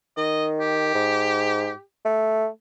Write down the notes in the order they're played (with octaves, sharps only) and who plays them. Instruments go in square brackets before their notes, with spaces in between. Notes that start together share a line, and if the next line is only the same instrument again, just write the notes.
[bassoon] D#3 [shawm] D#5
[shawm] G4
[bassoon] G#2
A3